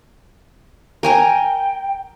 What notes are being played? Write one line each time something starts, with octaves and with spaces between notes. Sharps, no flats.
A#4 G5 G#5 A#5